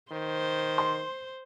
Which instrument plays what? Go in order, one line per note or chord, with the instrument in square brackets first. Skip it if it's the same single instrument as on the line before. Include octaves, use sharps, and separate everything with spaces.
[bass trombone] D#3 [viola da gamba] C5
[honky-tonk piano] C6